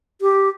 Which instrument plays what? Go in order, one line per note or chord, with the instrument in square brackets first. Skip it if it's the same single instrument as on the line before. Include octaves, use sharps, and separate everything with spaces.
[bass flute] G4